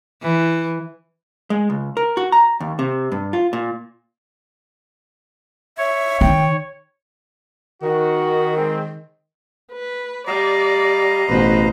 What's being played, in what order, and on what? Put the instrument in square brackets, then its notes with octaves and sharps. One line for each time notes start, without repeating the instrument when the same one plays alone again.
[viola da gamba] E3
[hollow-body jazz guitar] G#3
C#2
A#4
F#4
A#5
D#2
C3
G2
F4
A#2
[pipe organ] C#5 [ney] E5
[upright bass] D#3 [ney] G5
[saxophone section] D#3 [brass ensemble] F#4
[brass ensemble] G#3 C4
[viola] B4
[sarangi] G3 [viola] D5 [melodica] D#5 F5 A#5
[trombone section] A1 B2 [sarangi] B4 [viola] C5